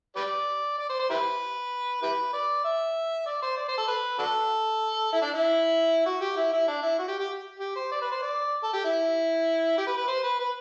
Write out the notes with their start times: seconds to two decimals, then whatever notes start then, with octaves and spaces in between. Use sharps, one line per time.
0.16 G4 B4 D5
0.78 D5
0.89 C5
0.99 C5
1.10 E4 G4 B4
2.02 E4 G4 B4
2.33 D5
2.64 E5
3.26 D5
3.42 C5
3.57 D5
3.68 C5
3.78 A4
3.88 B4
4.19 D4 F#4 A4
5.13 E4
5.22 D4
5.33 E4
6.06 F#4
6.21 G4
6.36 E4
6.52 E4
6.68 D4
6.83 E4
6.99 F#4
7.08 G4
7.19 G4
7.60 G4
7.76 C5
7.92 D5
8.01 B4
8.11 C5
8.22 D5
8.63 A4
8.73 G4
8.85 E4
9.78 G4
9.87 B4
9.97 B4
10.07 C5
10.24 B4
10.39 B4